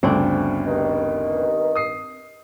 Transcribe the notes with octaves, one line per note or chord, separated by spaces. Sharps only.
G1 D2 C#3 C4 D4
G2 D#3
D#6 C7